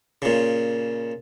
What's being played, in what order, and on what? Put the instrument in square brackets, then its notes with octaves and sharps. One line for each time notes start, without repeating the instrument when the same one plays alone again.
[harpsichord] A#2 C#3